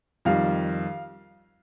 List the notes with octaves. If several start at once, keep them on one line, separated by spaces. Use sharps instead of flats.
F2 D#3 G3 F5